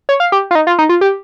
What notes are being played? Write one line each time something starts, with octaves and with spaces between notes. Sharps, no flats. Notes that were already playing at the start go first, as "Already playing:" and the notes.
C#5
F5
G4
F4
D#4
F4
D#4
F4
G4